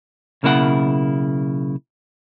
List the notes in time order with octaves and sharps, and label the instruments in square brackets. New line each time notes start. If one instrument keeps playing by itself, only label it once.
[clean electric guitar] B1 C#3 A#3 E4 B4 F#5